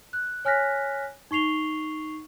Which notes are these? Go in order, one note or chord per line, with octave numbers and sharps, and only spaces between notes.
F#6
C#5 G#5 F6 F#6 A#6 B6
D#4 C#6 C7 F7 G7